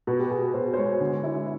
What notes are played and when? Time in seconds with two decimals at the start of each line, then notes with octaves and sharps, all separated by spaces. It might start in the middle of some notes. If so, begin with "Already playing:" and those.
0.07 B2 F#4
0.19 G4
0.30 B2 G#4
0.54 B2 C5
0.74 C5
0.77 G#3 C#5
1.00 D3
1.24 E4